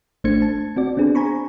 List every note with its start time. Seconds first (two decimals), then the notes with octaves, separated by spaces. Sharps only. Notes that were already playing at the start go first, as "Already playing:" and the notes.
0.24 A1 A3 D4 C5 G#6 C#7
0.42 A5
0.76 C4 F#4 D5
0.97 B3 C4 D4 G#4
1.15 C5 G#5 A#5 B5 C#6